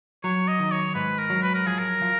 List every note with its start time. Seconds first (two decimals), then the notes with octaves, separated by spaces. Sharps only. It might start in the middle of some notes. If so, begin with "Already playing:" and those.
0.24 F#3 C#5
0.48 D#5
0.60 D#3
0.72 C#5
0.95 G#2 B4
1.19 A#4
1.30 F#3
1.43 B4
1.54 A#4
1.66 F3 G#4
1.79 A#4
2.02 F3